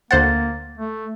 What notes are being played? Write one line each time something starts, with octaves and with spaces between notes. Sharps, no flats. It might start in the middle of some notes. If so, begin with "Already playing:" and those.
D2 A#3 C5 F#5 A6
A3